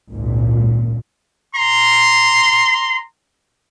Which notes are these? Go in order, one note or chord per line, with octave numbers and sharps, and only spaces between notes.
G#1 C#2 A#2
A#5 C6